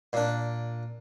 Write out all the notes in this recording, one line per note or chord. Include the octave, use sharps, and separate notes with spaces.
A#2 D4